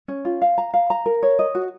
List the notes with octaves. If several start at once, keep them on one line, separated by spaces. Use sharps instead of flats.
C#4
F4
F5
A#5
F5
A#5
A#4
C#5
D#5
F#4